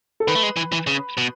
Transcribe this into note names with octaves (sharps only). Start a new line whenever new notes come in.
A4
D#3 B4
A3
G#3
E3
E3
C#3
B2